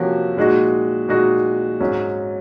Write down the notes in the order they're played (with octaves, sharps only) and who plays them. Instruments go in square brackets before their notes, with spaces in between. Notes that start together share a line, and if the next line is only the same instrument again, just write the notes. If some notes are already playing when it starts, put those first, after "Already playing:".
Already playing: [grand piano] C3 F3 A#3 C#4 F#4
A#2 G#3 D#4 F#4
A#2 G#3 D#4 F#4
G#2 F#3 C#4